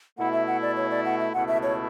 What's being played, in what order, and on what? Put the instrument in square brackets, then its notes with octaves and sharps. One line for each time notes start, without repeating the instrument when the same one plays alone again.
[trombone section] B2 A3 E4 [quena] F#5
[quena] E5
F#5
D5
C#5
D5
F#5
E5
[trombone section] C#2 B2 A3 E4 [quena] F#5
[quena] E5
C#5